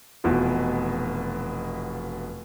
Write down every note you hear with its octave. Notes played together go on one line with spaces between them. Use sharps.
F1 B2 E3 F4